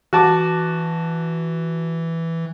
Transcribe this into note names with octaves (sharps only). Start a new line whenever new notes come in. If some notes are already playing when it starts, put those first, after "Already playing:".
E3 F#4 A5 D6